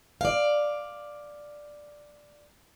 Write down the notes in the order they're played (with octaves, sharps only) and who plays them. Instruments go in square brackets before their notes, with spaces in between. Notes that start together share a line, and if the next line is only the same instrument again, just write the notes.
[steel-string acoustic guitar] D5 F5